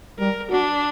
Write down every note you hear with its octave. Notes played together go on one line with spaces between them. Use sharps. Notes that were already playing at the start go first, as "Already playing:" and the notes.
G3 A#4
D4 F#4